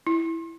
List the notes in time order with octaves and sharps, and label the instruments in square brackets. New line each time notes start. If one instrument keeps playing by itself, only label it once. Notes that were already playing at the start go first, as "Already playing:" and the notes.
[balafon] E4